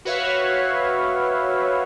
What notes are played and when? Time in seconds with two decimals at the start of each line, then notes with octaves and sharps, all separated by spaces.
0.05 F#4 B4 C#5 E5 F5